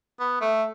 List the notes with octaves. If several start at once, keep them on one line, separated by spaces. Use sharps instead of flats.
B3
A3